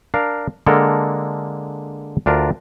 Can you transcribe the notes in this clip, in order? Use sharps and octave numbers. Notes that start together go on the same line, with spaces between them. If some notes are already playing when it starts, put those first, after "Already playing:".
D4 A#4 F5
D3 G#3 A#3 A4 A#4
D2 D4 F4 A#4